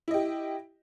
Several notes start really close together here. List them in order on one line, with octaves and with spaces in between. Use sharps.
E4 D#5 G4